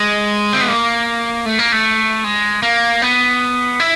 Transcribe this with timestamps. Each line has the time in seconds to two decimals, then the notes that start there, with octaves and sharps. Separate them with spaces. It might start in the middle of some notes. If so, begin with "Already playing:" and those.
Already playing: G#3
0.53 C4
0.61 B3
0.68 A#3
1.46 A3
1.59 A#3
1.72 A3
2.24 G#3
2.63 A#3
3.02 B3
3.80 E4